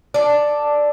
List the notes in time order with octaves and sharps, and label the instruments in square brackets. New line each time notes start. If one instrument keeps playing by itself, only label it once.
[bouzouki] A4 D5